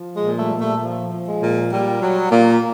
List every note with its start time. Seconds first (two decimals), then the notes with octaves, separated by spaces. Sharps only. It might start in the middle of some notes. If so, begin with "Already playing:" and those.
Already playing: F3
0.15 G#3
0.22 A#2
0.37 G3 A3
0.53 A#2
0.59 G3 A3
0.82 F3
1.12 F3
1.27 G#3
1.42 A#2
1.72 A#2 G3
2.01 F#3
2.31 A#2